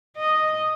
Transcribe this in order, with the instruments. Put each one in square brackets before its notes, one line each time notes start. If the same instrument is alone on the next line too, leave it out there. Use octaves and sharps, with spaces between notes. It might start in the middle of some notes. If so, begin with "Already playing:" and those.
[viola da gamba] D#5